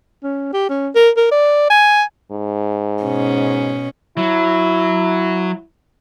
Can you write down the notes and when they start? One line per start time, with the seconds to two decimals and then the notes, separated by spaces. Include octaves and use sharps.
0.23 C#4
0.53 G4
0.69 C#4
0.95 A#4
1.17 A#4
1.31 D5
1.70 G#5
2.32 G#2
3.03 B2 C#4
4.17 F#3 E4